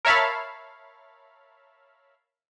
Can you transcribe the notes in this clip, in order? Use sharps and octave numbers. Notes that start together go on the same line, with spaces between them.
A#4 C#5 E5 F5 A5 B5